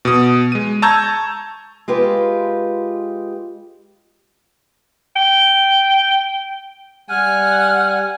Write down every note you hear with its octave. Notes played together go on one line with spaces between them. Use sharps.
B2 D#6
G#3 D#7
A5 A#5 C#6 E6 G6 G#6
G#3 F4 G4 B4
G5
G3 F#5 G#5 F6